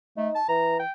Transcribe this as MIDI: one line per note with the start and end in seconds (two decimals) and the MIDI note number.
0.17 0.29 57
0.17 0.37 63
0.35 0.45 81
0.49 0.79 52
0.49 0.75 82
0.79 0.91 79